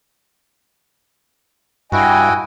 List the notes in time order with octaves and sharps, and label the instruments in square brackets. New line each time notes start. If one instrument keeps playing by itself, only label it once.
[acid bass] G2 [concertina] E4 F#4 [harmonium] D#5 G5 G#5